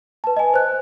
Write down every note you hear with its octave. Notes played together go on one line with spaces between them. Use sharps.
B4 A5
D#5 G#5
C5 F#6